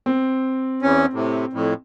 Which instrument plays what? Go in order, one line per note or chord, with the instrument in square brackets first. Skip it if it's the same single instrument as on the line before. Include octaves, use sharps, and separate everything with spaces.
[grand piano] C4
[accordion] E2 C#4
A2 C3
F2 A2